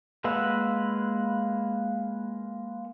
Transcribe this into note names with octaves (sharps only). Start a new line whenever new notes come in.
G#3 A#3 B4 F#5 E6